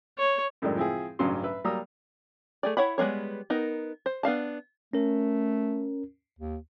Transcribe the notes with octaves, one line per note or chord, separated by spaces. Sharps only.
C#5
F#2 A2 D#3 F#3 G#3 D4
F3 C4 E4 G#4
A1 G2 C#3 F#3 C6
B4 E5
F#3 G3 A#3 A#5 D#6 E6
A3 G#4 D5
E4 C#5 F#5 B5
G3 G#3 B3 F4 C#5
B3 D#4 A#4
C5
B3 D4 F5 A5
A3 C#4 A#4
D#2